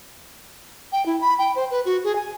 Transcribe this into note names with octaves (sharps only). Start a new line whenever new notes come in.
G5
E4
B5
G5
C5
B4
F#4
G#4
G#5